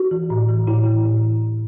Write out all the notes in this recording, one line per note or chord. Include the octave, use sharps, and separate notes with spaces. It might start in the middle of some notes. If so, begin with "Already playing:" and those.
Already playing: F#4
E3
A2
E3
A2 E4
E3
A2